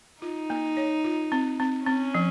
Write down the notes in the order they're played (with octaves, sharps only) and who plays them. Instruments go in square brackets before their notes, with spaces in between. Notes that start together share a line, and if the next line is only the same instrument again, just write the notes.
[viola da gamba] D#4 [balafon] F4
[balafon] A#3
C#5
F4
C4
C4
[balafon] C4 [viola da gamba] C#4
[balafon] F3